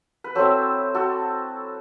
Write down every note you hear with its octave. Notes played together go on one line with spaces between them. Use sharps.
B4
F#3 C4 E4 A4 C5
F#4 A4